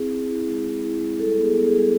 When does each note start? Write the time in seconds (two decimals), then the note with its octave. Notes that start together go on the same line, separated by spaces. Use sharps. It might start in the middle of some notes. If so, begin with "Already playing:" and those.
Already playing: C4 E4 G#4
0.11 C4
0.29 E4
0.47 G#3
0.65 E4
0.83 E4
1.01 G#3
1.19 G3 A4
1.37 B3
1.43 G#4
1.55 B3
1.67 G#4
1.73 G3